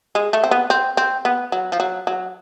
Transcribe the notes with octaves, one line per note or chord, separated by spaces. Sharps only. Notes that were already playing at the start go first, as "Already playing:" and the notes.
G#3
A3
C4
B3
C4
C4
B3
F#3
F3
F#3
F#3